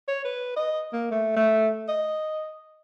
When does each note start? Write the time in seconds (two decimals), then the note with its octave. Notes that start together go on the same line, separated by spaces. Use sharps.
0.08 C#5
0.25 B4
0.56 D#5
0.93 A#3
1.11 A3
1.36 A3
1.88 D#5